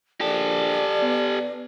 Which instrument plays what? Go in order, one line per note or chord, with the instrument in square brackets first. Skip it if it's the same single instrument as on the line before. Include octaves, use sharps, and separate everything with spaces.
[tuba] A#1 [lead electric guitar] G4 A4 [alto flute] D5
[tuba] B3